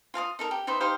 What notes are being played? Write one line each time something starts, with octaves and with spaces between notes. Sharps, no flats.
F4 F5 A5 D#6
D#4 A4 A#4
G4
D#4 B4 C5 E5
D#4 G4 C5 F5